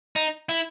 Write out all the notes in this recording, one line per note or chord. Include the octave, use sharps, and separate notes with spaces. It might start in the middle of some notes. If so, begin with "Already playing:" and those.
D#4
E4